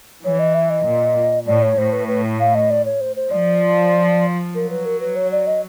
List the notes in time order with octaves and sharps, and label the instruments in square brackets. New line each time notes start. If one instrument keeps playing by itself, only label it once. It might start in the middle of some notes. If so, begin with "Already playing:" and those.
[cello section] E3 [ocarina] C#5
[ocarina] D#5
E5
D#5
[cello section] A#2
[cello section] A2 [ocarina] D5
[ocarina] C#5
[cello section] A2 [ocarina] C5
[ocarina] B4
B4
F5
D#5
D5
C#5
C5
C5
[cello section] F3 [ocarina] D5
[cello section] F#3 [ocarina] A#4
[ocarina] B4
A#4
B4
C#5
D5
D#5